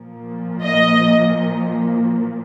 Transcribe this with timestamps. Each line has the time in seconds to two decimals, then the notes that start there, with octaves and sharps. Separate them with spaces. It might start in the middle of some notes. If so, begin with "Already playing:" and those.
Already playing: A#2 F3 A#3
0.63 D#5